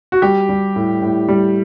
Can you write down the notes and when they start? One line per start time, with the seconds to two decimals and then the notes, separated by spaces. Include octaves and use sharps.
0.12 F#4
0.22 G3 G4
0.49 G3
0.76 A2
1.02 A2
1.28 G3